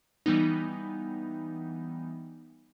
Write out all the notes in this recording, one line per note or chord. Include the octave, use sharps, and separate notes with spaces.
E3 G3 B3 D#4